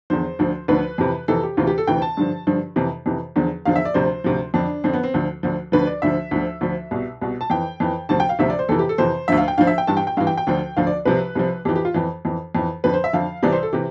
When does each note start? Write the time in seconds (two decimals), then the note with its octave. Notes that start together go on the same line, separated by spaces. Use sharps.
0.10 E2 D3 F3 C5
0.39 D2 D3 F3
0.68 D2 D3 F3 B4
0.98 F2 C3 E3
1.28 F2 C3 E3 A4
1.43 G4
1.57 D2 C3 E3 F4
1.67 G4
1.78 A4
1.87 D2 C3 E3 G5
2.02 A5
2.17 G2 D3 F3
2.47 G2 D3 F3
2.76 F2 C3 E3
3.06 F2 C3 E3
3.36 E2 D3 F3
3.65 E2 D3 F3 F5
3.76 E5
3.85 D5
3.94 D2 C3 F3 C5
4.24 D2 C3 F3
4.54 F2 D3 F3 D4
4.84 F2 D3 F3 C4
4.93 B3
5.03 C4
5.14 D2 D3 F3
5.43 D2 D3 F3
5.72 D2 D3 F3 B4
5.87 D5
6.02 D2 D3 F3 E5
6.31 D2 D3 F3
6.61 D2 D3 F3
6.91 C2 B2
7.21 C2 B2
7.41 A5
7.50 F2 E3 G5
7.80 F2 E3
8.09 D2 C3 F3 A5
8.20 G5
8.29 F5
8.39 D2 C3 F3 E5
8.50 D5
8.59 C5
8.69 F2 C3 E3 A4
8.79 G4
8.89 A4
8.98 F2 C3 E3 C5
9.28 D2 D3 F3 E5
9.38 F5
9.48 G5
9.58 D2 D3 F3 F5
9.67 E5
9.78 G5
9.87 G2 E3 A5
9.97 G5
10.07 G5
10.17 G2 E3 F5
10.27 G5
10.37 G5
10.47 D2 D3 F3
10.77 D2 D3 F3 F5
10.87 D5
11.05 C2 C3 F3 B4
11.35 C2 C3 F3
11.65 F2 E3 G4
11.76 G4
11.85 F4
11.94 F2 E3
12.25 F2 E3
12.55 F2 E3
12.84 F2 D3 F3 B4
12.94 C5
13.04 E5
13.13 F2 D3 F3 F5
13.43 C2 C3 E3 D5
13.52 C5
13.63 A4
13.73 C3 E3 G4